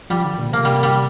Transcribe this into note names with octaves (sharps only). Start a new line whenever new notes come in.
F3 G3
D3
A#2
C3 A#3
G3
G3